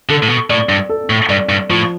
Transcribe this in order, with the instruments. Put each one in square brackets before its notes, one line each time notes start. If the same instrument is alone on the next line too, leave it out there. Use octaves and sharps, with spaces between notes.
[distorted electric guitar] D3 [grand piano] A4
[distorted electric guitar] A2
B2
[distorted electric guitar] A2 [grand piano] D5
[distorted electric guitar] G2
[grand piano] A4
[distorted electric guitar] A2
[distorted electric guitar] G2 [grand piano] D5
[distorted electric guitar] G2
[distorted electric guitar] A2 [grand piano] F3